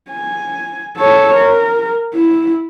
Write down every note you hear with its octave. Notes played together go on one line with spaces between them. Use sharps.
G#5
A4 C#5
A#4
E4